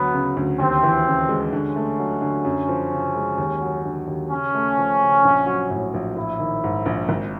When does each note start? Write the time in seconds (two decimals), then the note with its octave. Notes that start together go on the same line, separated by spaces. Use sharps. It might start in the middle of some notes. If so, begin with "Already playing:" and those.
Already playing: D2 F#3 B3
0.14 C#3
0.37 D2
0.59 D#2 C4
0.83 E3
1.06 C#3
1.29 G#3
1.53 D3 C#4
1.76 A3
1.99 F#3
2.22 D3
2.45 F#2
2.69 F3
2.92 C#3
3.16 G#3
3.38 D#2
3.61 F#3
3.85 D3
4.07 D#2
4.31 C#3 C#4
4.55 A3
4.78 F3
5.00 C#3
5.24 A#1
5.46 F#3
5.70 A2
5.94 A#1
6.16 A#1 E4
6.39 D#3
6.64 G#2
6.86 A#1
7.09 G#1